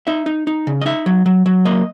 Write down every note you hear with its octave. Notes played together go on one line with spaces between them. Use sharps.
D#4 E5
D#4
D#4
C#3
D#5
D#4 E5
F#3
F#3
F#3
A#3 D#5